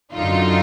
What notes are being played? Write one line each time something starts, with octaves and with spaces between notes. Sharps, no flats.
F#2 D3 D#4 F4